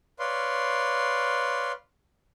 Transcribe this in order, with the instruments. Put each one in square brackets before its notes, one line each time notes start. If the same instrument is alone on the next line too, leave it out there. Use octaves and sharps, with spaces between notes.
[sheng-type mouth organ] B4 C#5 D5 F5 C6